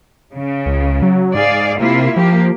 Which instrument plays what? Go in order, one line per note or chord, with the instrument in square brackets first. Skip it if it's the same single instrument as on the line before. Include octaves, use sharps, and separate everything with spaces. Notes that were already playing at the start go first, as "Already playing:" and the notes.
[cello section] C#3
[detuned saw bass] C#2
F#3
[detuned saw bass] G#2 [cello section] G#4 D5 F5
[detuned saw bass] C3 [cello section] A#3 E4 F4
[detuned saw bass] F3 [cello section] A#3 G4